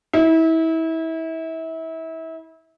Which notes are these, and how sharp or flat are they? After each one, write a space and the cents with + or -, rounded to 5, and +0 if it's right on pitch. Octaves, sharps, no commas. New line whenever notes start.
E4 -30